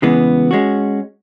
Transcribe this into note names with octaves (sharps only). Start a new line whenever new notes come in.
C#3 E3 G#3 B3
G#3 C#4 F#4